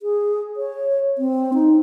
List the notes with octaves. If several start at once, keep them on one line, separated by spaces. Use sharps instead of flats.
G#4
C#5
C4
D#4